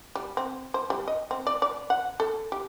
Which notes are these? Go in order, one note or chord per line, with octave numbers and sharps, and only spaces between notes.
G3
C4
C5
G3
D#5
C4
D5
D5
F#5
A4
G4